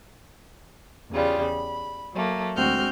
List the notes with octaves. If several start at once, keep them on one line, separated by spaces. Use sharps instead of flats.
E2 C#3 G3 F4
B5
F#3 A3 A#3
D2 G#3 C4 F#4 F6 G6